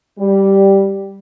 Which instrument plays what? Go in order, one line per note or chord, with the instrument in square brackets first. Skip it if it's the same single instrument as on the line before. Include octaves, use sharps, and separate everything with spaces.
[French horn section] G3